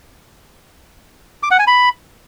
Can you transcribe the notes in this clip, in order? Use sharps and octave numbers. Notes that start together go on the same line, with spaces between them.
D6
F#5
G#5
B5